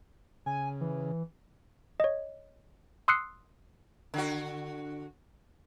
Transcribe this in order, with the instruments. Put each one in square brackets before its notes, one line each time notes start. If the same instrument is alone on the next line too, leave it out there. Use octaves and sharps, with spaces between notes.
[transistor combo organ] C#3 [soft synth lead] G#5
[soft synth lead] E3
[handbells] C#5 D#5
C6 D#6 E6 F#6 C7 C#7
[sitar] D3 F#4